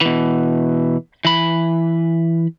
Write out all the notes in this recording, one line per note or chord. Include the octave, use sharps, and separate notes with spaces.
B2 E3
E3 B5